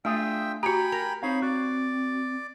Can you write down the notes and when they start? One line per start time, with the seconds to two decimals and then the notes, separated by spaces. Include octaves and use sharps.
0.05 A3 D4 F4 G#4 E5 G5
0.63 F#4 G4 G5 G#5 A#5 B5
0.92 A#4 A#5
1.23 C4 D#4 C5 C#5 F5 B5
1.42 F#4 D5